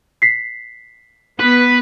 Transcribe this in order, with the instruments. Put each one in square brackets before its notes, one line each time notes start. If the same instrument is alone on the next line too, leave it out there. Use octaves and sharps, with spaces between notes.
[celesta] B6 C7
[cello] B3 [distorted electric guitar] B4